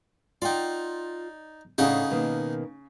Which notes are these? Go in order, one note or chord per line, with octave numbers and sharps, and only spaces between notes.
D#4 F4 D5 F#5 G5
A2 C#3 D4 D#4 G#4 A4 F#5
B2 D#3 A#3